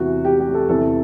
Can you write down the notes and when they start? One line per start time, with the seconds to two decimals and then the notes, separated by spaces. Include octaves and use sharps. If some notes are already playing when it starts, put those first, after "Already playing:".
Already playing: E2 C3 E3 F#4
0.25 G4
0.40 G4
0.54 A4
0.68 E2 C3 E3 A4